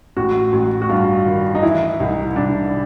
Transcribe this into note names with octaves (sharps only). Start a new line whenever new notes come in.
A1 F#4
A1
F#4
G2 F4
D#3
D#4
E3 E4
C2 D#4
C2 D4